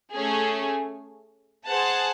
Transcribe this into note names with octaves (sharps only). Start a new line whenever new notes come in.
A3 C#4 G#4
G#4 C5 F#5 A5